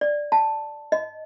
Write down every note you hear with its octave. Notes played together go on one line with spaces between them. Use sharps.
D5
A5
D#5